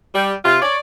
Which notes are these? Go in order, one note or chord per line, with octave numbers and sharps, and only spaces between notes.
G3
C3 F4
C#5 D5